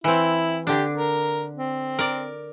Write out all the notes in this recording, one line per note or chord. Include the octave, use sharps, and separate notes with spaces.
E3 C4 E4
D3 D4 G4
A#4
C4
A#4 D5